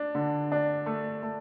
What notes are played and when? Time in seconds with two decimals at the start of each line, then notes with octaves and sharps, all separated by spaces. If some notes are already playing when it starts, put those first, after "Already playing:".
Already playing: D4
0.15 D3
0.52 D4
0.86 A3
1.23 A3